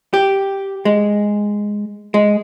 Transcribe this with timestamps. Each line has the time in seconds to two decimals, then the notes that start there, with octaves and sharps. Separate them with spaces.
0.14 G4
0.85 G#3
2.14 G#3